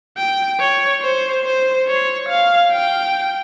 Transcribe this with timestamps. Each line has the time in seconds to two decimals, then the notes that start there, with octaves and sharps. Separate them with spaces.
0.17 G5
0.60 C#5
1.02 C5
1.44 C5
1.88 C#5
2.29 F5
2.72 G5